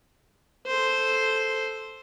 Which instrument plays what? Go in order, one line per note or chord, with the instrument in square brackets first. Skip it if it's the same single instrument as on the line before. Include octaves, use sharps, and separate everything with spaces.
[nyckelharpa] A4 C5